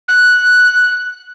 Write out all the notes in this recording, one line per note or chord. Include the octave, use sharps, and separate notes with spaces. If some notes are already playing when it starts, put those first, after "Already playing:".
F#6